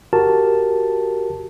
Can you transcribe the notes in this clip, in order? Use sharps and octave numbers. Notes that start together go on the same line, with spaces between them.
F#4 G4 A#4 A5